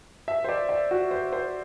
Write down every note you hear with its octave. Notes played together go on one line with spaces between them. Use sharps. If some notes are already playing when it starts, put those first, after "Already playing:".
E5
C5
D5
D5
F#4
C5
C5